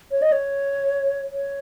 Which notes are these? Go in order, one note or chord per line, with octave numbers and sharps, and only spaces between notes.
C#5
D#5
C#5
C#5